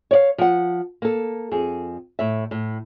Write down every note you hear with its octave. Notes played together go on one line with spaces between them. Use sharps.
C#5 D5 F5
F3 F#5
A#3 A4
F2 G#4
A2 E5
A2